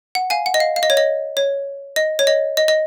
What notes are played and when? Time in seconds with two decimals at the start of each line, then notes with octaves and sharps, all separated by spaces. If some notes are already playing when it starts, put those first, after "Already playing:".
0.15 F#5
0.30 F5 G#5
0.46 F#5
0.54 D#5
0.60 F5
0.76 F5
0.83 D#5
0.90 C#5
0.97 D#5
1.37 C#5
1.96 D#5
2.19 C#5
2.27 D#5
2.57 D#5
2.68 D#5